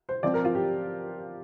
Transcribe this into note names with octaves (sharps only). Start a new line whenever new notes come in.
C5
F3 C4 D5
A#4
F4
G4